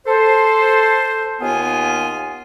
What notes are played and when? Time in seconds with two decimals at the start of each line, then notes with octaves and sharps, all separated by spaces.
0.06 A4 C5
1.41 D#2 B3 F4 G#5